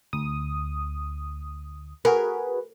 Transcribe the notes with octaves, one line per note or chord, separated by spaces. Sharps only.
D2 D#6
F#4 G#4 A#4 B4